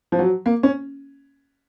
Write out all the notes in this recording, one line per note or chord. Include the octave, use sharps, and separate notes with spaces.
F3
F#3
A#3
C#4